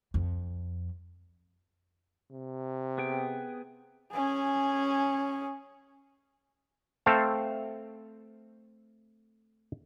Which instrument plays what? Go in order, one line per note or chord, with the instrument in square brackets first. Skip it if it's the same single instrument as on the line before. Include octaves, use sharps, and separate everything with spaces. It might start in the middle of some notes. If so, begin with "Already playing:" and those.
[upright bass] F2
[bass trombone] C3
[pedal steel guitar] B3 G#4 G5
[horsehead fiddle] C#4 G#4
[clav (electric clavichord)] A3 C4 A4 C5 F5